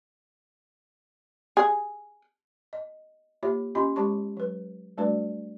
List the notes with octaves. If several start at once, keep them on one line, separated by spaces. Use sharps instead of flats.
G#4
D#5
A#3 F4 G4 C#5 E5
C#4 F4 G4 D#5 B5 C6
G#3 G4 C#5 A5 B5 C#6
F#3 B4
G3 A3 D4 F#4 B4 D5